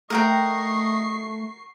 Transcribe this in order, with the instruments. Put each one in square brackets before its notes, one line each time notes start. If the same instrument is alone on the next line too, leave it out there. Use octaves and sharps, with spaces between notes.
[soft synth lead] A3 [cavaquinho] A#4 F#5 G5 [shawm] D#5 [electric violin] C#6 C7